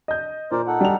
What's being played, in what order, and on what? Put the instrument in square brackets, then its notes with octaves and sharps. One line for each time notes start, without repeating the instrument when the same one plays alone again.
[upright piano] D#5 G6
[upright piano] A#2 [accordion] A#4 C5 D5
[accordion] D#4 A4 F#5
[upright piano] G3 F7